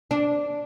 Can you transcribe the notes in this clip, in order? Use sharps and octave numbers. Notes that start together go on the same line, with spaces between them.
D4